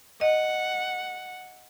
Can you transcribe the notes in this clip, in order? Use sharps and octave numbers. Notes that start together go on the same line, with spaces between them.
D#5 F#5